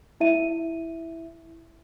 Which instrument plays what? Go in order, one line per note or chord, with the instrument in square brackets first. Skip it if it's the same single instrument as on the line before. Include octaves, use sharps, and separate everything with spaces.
[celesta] E4 E5 D#7